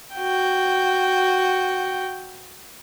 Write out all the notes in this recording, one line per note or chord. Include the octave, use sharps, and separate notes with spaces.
F#4 G5